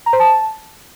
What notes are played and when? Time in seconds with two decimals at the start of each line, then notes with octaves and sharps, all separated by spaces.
0.06 A#5
0.13 C5
0.20 A5